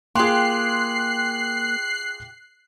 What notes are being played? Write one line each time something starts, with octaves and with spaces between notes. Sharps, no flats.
A#3 F4 G4 G#4 G5 C6 F#6 C7